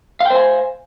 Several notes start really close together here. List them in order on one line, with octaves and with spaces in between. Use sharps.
F5 G5 C5 G#5